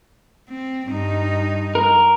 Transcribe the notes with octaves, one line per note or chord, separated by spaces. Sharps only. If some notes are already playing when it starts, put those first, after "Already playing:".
C4
G2 D#4
A#4